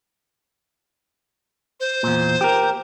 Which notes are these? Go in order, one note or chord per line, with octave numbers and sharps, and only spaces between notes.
C5
E2 A#2
G4 A#4